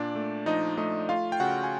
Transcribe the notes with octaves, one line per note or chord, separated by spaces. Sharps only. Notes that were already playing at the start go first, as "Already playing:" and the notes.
Already playing: A#2 D4 D5
A3
F3 D#4 D#5
A3 D#4 D#5
A3 F4 F5
G5
C#3 F#4 F#5
G#5